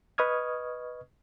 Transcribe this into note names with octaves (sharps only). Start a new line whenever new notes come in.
B4 D#5 C#6 D#6 F6 G#6